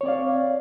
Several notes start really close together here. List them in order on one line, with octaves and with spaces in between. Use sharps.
C#5 C4 D5 F5